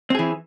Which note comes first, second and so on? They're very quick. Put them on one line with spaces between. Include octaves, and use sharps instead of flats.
C4 G#4 E3